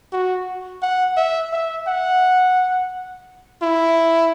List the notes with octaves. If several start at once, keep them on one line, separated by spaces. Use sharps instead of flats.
F#4
F#5
E5
E5
F#5
E4